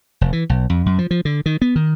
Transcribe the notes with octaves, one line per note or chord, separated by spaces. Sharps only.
F1
E3
B1
F2
F#2
F3
F3
D3
D#3
B3
D#3